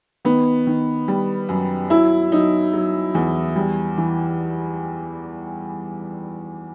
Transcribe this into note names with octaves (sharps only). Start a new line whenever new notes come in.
D#3 B3
D#3
G3
F#2
F#3 E4
F#3 D#4
F#3
E2
G3
E3